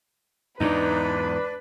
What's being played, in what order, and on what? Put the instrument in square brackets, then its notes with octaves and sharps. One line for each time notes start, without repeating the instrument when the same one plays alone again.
[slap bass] E2 G#2 [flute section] D4 [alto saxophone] D#4 [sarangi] B4